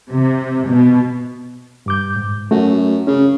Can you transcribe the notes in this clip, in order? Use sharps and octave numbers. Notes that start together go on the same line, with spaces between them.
C3
B2
G2 D6 G6
G#2
F#2 A3 F#4
C#3 C#4